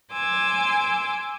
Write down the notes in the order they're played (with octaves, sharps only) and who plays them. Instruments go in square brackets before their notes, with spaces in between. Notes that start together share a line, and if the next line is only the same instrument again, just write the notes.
[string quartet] G#5 C6 D6 E6